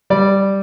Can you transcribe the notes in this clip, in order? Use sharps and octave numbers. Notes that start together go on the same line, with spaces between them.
G3 D5